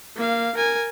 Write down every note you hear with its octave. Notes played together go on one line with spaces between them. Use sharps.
A#3 F5
A#4 G#5